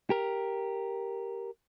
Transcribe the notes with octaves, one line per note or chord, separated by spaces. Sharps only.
G4 A#4